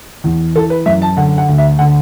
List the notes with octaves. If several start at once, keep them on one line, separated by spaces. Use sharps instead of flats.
E2
E3 A4
B4
F#2 E5
A5
D3 F#5
F#5
D2
E5
D3 F#5